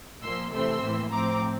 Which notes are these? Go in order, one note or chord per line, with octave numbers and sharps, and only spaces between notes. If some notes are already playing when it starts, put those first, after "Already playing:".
A#2 F3 A#3 C6 E6
C3 E3 A3 C4 C6 E6
A2 E3 A#3
A2 F3 C4 A#5 D6